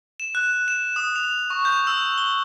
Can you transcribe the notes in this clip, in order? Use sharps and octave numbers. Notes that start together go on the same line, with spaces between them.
E7
F#6
E7
D#6
F7
C#6
G6
E6
G7